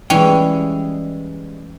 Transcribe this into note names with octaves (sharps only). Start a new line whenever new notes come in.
E3 G3 G#3 C#4 G5